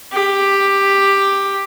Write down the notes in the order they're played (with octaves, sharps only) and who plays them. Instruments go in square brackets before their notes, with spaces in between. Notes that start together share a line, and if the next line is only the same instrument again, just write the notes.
[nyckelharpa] G4